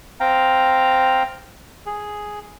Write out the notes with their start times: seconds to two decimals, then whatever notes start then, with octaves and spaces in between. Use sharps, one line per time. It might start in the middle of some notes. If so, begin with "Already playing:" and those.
0.20 C4 F5 G5 A#5
1.86 G#4